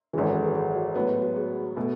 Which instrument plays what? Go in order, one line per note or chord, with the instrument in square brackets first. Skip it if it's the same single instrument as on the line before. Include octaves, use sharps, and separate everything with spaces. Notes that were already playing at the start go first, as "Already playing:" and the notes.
[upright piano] G#1 F#2 E3 [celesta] G#4
[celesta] A4
B4
G#4
G#4
F#4
[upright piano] A2 F#3 B3 [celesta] F#4
[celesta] F#4
F#4
G#4
[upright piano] B2 A3